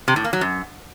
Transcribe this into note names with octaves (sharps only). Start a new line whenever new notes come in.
C3
A2
A#3
F#3
F#2